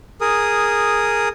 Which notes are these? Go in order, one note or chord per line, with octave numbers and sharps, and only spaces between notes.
G#4 A#4 D#6